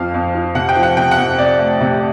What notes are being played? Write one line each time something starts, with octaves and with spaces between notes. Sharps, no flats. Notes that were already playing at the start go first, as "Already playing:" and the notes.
Already playing: F2 F3 F5
F2
F3
C3 F#5
G5
F3
F#5
C3 G5
F#5
F2
C3 D5
A3
C3